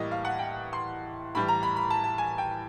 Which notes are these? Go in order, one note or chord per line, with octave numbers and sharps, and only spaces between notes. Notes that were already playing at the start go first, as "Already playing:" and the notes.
Already playing: A2 E3 G3 A#3 D#5
F5
F#5
G5
C6
A2 E3 G3 B5
A#5
B5
B5
A5
A5
G#5
G5